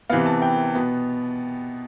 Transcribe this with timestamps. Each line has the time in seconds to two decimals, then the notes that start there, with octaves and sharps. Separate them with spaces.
0.10 C3 E3 B3 F5
0.26 A5
0.42 G5
0.75 B2 B3